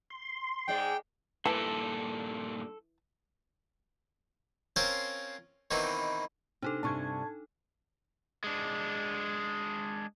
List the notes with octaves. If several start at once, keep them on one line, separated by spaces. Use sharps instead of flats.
C6
G#2 G#3 D5 G5
G2 A#2 E3 A4 A5
C4 C#4 F4 A#4 C5
B2 D#3 E3 C4 D#4
C3 D4 D#4 A4
G2 C3 G3 A5 C#6 G#6
G#3 D4